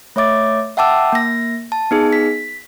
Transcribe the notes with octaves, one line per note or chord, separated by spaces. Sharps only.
A3 C#5 E5 D6 A6
E5 F#5 G5 A5 D6 E6
A#3 A#6
A5
B3 D#4 G#4
B6